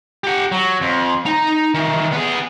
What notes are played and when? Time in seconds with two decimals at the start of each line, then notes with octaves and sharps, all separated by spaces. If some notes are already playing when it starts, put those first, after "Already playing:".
0.24 G4 F#5
0.52 F#3
0.81 F2
1.26 D#4 A#5
1.74 D#3 E3
2.12 B3 G#4